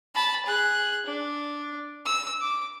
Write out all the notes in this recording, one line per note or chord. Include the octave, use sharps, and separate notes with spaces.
A5 B5
G#4 F#6
D4
E6
D6